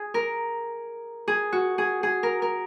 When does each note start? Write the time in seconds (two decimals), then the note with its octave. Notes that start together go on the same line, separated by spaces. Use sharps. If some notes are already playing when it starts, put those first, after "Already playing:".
Already playing: G#4
0.14 A#4
1.28 G#4
1.52 F#4
1.78 G#4
2.03 G#4
2.23 A#4
2.42 A#4